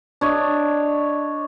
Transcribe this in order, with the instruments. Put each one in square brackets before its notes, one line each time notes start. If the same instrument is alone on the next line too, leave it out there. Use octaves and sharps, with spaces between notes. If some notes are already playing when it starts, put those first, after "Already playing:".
[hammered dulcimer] D4 C#5 D#5